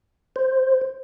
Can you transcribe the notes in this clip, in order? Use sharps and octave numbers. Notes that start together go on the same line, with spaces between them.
C5